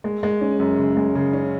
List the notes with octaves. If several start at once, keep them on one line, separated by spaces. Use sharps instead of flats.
G#3
G#3
C#4
F#2
C#3
G#3
C#3
C#4